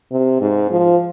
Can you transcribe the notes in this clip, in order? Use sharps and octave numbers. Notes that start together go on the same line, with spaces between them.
C3
G#2
F3